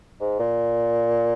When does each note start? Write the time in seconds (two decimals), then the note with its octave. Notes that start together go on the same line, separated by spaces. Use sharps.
0.21 G#2
0.40 A#2